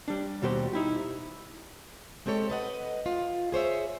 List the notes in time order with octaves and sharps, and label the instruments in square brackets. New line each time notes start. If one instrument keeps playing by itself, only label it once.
[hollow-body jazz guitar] G3 D4
D#2 B2 G3 F#4 G4 C5
D#4 E4 G4
[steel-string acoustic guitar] G#3 C4 G4 A4 C#5
B4 D#5 F#5
F4
G#4 C5 C#5 E5